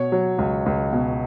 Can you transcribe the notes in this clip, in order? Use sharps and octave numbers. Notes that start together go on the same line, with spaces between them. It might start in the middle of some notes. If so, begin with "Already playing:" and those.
Already playing: B2 C#5
F#3
C#2
C#2
B2